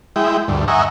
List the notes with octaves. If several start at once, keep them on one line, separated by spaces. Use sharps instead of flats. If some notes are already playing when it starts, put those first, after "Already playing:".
G#3 E4 G5
D2 G2
D#5 E5 F#5 G#5 A#5 C#6